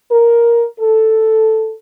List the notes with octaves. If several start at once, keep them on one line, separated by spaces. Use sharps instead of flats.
A#4
A4